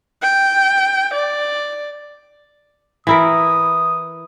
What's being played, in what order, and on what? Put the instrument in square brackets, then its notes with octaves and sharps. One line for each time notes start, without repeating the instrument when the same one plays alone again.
[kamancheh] G5
D5
[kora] E3 E4 A#4 [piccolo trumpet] D#6